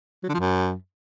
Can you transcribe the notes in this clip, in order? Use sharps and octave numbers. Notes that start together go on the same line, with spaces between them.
F#3
D3
F3
F#2